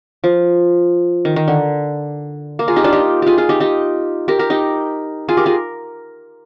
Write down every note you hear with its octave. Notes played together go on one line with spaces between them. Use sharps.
F3
D#3
D#3
D3
A#3
F4 G#4
D#4 G4
D4 F4
D#4 G4
F4 G4 G#4
F4 G#4
D#4 G4
D#4 G4
G4 A#4
G4 A#4
D#4 G4
F4 G#4
G4 A#4
F4 G#4